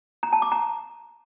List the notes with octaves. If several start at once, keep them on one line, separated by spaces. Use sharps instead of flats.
A#5
A5
D6
A#5